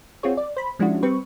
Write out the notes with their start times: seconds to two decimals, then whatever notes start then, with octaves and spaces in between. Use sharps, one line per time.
0.23 C4 F4 F#4 G#4 C#5
0.37 D5
0.57 C5 B5
0.79 F3 G#3 C#4 D4 E4 F#4
1.03 G3 C4 B4 C#6